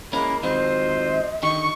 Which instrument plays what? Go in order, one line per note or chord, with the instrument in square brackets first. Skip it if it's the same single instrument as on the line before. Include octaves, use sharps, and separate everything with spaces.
[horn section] G#3 A#3 [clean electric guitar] C#4 E4 A#4 [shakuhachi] B5
[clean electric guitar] D#3 G#3 C4 [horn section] F#3 F4 C5 [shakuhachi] D#5
[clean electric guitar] D3 D#3 G4 [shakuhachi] D#5 [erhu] C#6